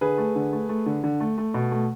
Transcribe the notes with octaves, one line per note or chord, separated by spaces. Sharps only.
D3 G#4 B4
A3
D3
A3
A3
D3
D3
A3
A3
B2
A3